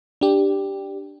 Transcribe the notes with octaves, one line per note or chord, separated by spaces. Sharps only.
D4 G4